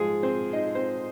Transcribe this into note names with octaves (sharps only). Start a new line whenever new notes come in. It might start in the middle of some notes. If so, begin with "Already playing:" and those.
Already playing: G#2 F3 G#3 F4 G#4
C4 C5
D#4 D#5
C4 C5